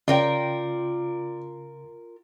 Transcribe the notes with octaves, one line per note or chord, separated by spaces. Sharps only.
C#3 F4 A#4 D5 G5